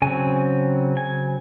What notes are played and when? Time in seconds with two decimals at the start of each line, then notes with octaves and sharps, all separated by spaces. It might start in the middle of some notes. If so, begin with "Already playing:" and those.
0.02 C#3 F#3 C4 G#5
0.97 G#5